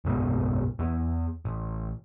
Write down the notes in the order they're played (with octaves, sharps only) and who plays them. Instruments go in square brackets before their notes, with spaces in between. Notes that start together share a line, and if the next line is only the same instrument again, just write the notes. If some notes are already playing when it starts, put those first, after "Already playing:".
[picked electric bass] F#1 B1 G#2 B3
E2 B3
A1